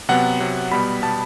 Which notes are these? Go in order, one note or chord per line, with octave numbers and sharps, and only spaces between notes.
C3 F#3 B3 F#5
C3 F#3 B3
B2 G3 B3 B5
B2 G3 B3 A5